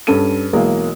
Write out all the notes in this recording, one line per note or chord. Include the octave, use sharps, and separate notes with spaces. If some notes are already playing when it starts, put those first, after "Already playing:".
G2 C#4 A4 D#7
B1 E3 G#3 A#3